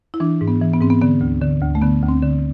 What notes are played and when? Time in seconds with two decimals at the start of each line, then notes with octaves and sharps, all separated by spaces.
0.14 E4
0.20 E3 D4
0.41 G#2
0.48 B3
0.61 E3
0.74 B3
0.81 G#2 C4
0.90 B3
1.01 D3 B3
1.21 D2
1.41 D3
1.62 D2
1.75 A3
1.82 D3 B3
2.02 D2
2.08 C4
2.23 D3